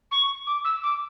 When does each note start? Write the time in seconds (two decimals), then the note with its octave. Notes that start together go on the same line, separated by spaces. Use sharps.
0.11 C#6
0.47 D6
0.65 E6
0.83 D6